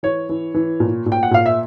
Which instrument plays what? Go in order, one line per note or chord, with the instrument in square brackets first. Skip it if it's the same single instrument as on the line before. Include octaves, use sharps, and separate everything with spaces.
[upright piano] E3 C#5
E3
E3
A#2
A#2
G5
F#5
A#2 F5
E5